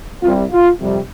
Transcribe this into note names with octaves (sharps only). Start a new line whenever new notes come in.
C2 C3 G3 F4
F4
F2 C3 G3